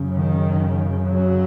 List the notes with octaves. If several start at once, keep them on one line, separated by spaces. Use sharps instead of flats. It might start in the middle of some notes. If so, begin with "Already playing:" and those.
Already playing: F#2 C#3
D#3
F#3